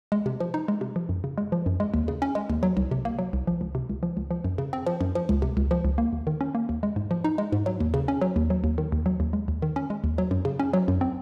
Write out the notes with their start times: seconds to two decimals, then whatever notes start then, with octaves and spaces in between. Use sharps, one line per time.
0.12 G#3
0.26 C3
0.40 F3
0.54 D#4
0.68 G#3
0.81 C3
0.96 F3
1.09 F#2
1.24 C#3
1.38 G#3
1.52 F3
1.66 F#2
1.80 G#3
1.94 D#2
2.08 C#3
2.22 C#4
2.35 G#3
2.50 D#2
2.63 F#3
2.77 C2
2.91 C3
3.05 A#3
3.19 F#3
3.33 C2
3.47 F3
3.61 C#2
3.75 C3
3.90 C#2
4.03 F3
4.17 C#2
4.31 F3
4.44 F#2
4.58 C#3
4.73 C4
4.86 F3
5.01 F#2
5.15 F3
5.29 C#2
5.42 C3
5.57 C#2
5.71 F3
5.85 C#2
5.98 A#3
6.13 D#2
6.27 D#3
6.41 C#4
6.55 A#3
6.69 D#2
6.83 G#3
6.96 G#2
7.11 F3
7.24 D#4
7.38 G#3
7.52 G#2
7.66 F#3
7.80 D#2
7.94 C#3
8.08 C#4
8.22 F#3
8.36 D#2
8.50 F#3
8.64 D#2
8.78 D#3
8.92 D#2
9.06 F#3
9.20 D#2
9.33 G#3
9.48 D#2
9.62 D#3
9.76 C#4
9.90 G#3
10.04 D#2
10.18 F#3
10.31 F#2
10.45 C#3
10.60 C#4
10.73 F#3
10.88 F#2
11.01 C4